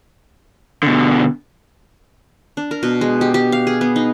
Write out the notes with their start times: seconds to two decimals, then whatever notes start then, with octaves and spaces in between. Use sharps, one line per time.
0.83 B2 D3
2.57 D4
2.71 A#4
2.83 B2
3.01 G#3
3.21 G4
3.34 G4
3.52 F5
3.67 G#4
3.81 B3
3.96 D#4